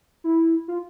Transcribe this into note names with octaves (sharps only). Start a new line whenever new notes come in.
E4
F4